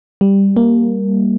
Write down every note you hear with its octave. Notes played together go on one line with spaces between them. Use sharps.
G3
A#3